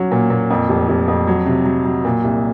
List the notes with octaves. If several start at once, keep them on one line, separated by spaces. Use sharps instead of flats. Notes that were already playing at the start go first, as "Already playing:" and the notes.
Already playing: F#3 C#4
A#2
A#2
F2
F1
F1
F2
F#3
C3
F#3
F#3
A#2
C2